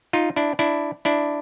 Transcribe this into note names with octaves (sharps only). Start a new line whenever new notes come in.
D#4 F4
D4 E4
D4 E4
D4 E4